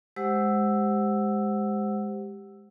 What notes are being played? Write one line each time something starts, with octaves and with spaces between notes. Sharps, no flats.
G#3 G4 C5 F#5 E6